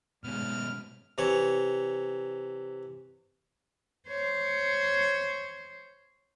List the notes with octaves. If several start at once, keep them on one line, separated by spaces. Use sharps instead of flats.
G#2 B2 C#4 F6
C3 E3 C#5
C5 C#5